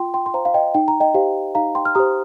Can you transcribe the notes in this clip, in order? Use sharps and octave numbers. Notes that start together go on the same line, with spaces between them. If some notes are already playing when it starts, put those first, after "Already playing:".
Already playing: F4 G5 C6
G5 C6
C6
C5 F5 A#5
F5
D#5 G5
D#4 G5
A#5
D#5 G5
G4 C5 F5
D#4 F5 A#5
G5 C6
F6
G4 C5 A#5 D#6